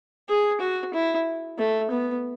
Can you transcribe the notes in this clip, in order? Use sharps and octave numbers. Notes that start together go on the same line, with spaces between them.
G#4
F#4
E4
A3
B3